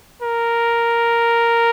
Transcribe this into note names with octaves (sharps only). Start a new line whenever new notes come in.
A#4